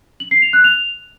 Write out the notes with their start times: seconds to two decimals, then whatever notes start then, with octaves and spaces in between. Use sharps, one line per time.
0.20 F#7
0.31 C7
0.42 F7
0.53 F#6
0.64 F7